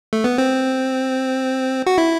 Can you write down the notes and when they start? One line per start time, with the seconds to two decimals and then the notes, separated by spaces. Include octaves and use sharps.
0.13 A3
0.24 B3
0.38 C4
1.86 F#4
1.98 E4